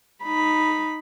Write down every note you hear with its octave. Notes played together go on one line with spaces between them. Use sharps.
D#4 B5